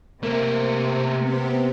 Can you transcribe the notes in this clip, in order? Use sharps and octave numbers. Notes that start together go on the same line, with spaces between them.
C3 A3 A#3 A#4
B3 C4 G4